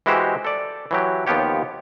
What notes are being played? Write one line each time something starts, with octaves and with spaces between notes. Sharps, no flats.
E3 G#3 E4 F#4 G4 C5
A4 D5
E3 F#3 G4
D#2 F3 B3 F4 G4 C#5